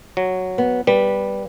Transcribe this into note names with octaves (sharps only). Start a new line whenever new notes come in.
F#3
B3
G3 B4